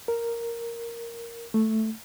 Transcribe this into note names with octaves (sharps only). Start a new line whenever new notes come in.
A#4
A3